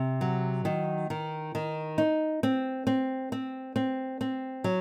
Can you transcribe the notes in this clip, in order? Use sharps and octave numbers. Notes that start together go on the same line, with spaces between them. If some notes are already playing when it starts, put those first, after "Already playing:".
Already playing: C3
F#3
D#3
D#3
D#3
D#4
C4
C4
C4
C4
C4
F#3